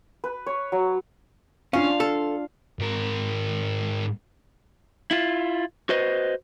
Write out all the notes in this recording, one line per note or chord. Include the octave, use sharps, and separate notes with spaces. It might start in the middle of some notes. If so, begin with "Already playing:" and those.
B4
C#5
F#3
C#4 D4 F4 F5
A4
G#2 A#4
E4 F4
F#4 B4 C5 D#5